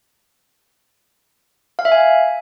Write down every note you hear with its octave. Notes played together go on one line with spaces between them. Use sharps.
F5
E5
G#5